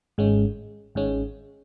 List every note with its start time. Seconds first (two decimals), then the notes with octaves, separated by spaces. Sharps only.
0.18 G#1 G#2 G#3 C#4
0.95 G#1 G#2 G#3 C#4